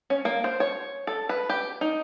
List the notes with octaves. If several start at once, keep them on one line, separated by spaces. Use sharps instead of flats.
C#4
A#3
C5
C#5
A4
B4
G4
D#4